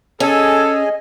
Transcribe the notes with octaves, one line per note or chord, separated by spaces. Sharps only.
C#4 G#4 A4 D#5 G#5